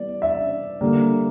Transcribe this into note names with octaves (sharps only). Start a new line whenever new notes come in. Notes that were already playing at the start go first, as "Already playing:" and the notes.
Already playing: E3 G3 B3 D5
E5
D3 G3 A#3